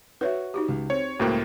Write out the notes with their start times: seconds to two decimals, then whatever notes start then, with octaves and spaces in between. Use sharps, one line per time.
0.21 F#4 B4 C#5 E5
0.54 D#4 F#4 G4
0.69 C#2
0.90 C4 C#5
1.20 C#2 A2 A#3 F#4 C5 G5 F#6